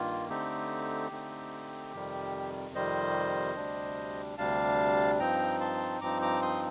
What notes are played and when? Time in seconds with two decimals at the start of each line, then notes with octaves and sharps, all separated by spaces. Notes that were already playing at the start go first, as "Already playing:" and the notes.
Already playing: G2 D#3 A#3 F4
0.29 D3 A3 C4 D#4 G4
1.11 D3 A3 C4 D#4
1.93 F2 C3 D#3 G3
2.75 F2 C3 D#3 G3 C5 D#5
3.56 D2 C3 G3 D4
4.38 D2 C3 G3 D4 F5 A5
5.19 G2 F3 C4 D#4 G5 A#5
5.60 A5 C6
6.01 G2 F3 C4 D#4 A#5 D6
6.22 A#5 D6
6.42 C6 D#6